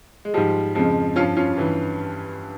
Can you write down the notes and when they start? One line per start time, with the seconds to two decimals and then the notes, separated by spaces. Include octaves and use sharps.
0.25 G#3
0.34 G#2 F3 G3
0.75 F2 C#3 F3 G#3
1.16 G2 F3 C#4 F4
1.37 C#4 F4
1.58 G2 E3